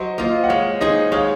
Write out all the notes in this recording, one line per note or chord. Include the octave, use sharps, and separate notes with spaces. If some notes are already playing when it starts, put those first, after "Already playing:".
Already playing: F#3 C5 D#5
A#3 F4 C5 D#5
F#5
G#3 C#5 F5
D#4 G#4 C5 D#5
G#3 C#5 F5